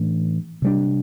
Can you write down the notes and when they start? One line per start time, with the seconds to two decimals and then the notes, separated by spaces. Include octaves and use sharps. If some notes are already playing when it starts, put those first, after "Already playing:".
Already playing: A2 E3 A3 D4
0.62 C3 G3 D4